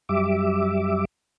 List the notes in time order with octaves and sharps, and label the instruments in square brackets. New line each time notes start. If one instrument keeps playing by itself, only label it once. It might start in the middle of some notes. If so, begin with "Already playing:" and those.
[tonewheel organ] F#2 G3 E5 D6